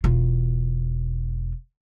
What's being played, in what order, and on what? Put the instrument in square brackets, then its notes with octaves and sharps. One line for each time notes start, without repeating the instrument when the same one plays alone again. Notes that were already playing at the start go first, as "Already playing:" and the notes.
[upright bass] E1 F4